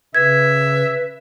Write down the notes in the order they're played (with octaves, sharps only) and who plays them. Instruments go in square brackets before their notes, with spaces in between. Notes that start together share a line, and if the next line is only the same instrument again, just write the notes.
[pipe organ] C#3 [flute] B4 [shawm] E5 [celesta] G#6